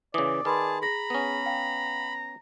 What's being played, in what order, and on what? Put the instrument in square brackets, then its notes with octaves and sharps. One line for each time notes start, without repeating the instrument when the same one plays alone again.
[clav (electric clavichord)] C#3 E3 [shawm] D5 [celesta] D6 D#6
[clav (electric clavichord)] D#3 [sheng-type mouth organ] G#4 A5 [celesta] B4 B5 C6
[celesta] G#4 A#6 [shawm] A#5 [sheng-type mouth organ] B5
[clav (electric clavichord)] B3 C#4
[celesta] F5 G5